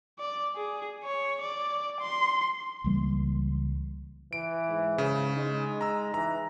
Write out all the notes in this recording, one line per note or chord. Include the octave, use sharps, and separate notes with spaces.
D5
G#4
C#5
D5
C6
C#2 E3 G3 A#3
E3 D7
G#2
C#3
G#3 D#4
A#5 E6
E3 A#5